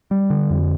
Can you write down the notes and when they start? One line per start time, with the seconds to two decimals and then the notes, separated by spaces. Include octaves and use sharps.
0.11 G3
0.30 D3
0.50 F2